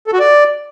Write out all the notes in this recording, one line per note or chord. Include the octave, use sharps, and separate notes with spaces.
A4
F#4
D5